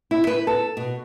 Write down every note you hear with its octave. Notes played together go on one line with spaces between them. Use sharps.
E4
B4
A4
B2